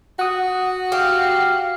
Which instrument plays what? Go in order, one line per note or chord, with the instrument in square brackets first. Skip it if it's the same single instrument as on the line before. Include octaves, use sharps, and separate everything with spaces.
[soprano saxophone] F#4 [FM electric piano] F#5 D#6
[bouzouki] G4 [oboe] F5